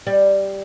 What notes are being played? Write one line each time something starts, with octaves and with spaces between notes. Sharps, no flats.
G3